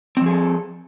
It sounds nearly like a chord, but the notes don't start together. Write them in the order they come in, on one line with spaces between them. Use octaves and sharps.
C4 F3 G#4 A4